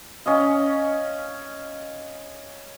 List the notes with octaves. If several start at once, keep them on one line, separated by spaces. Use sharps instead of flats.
C#4 D#5 F5